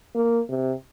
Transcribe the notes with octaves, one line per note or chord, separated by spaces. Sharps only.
A#3
C3